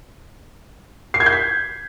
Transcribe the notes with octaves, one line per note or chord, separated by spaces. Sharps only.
C7
G#6
G6
B6